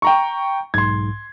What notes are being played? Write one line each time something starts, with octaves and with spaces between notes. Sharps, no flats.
G5 A#5 C#6
B1 G#2 C6 G#6